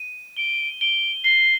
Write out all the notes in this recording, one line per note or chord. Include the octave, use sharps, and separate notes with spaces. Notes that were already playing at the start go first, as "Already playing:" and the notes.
Already playing: D#7
D7 G7
D7 G7
C7 G7